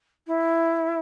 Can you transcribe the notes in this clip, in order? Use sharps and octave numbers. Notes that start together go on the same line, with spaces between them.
E4